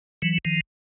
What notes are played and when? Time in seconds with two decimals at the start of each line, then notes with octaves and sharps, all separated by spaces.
0.22 E3 F#3
0.45 D#3 F3